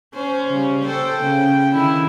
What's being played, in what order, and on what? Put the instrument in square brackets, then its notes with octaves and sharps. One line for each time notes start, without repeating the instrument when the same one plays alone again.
[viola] C#4 [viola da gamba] C5
[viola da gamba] C#3 G3
[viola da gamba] A4 C5 [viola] G5
[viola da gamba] C#3
[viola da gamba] D3 D#3 [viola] E4